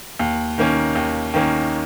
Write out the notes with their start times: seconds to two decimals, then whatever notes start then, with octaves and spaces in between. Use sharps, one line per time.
0.19 D#2
0.58 D#3 A#3 C#4
0.95 D#2
1.34 D#3 A#3 C#4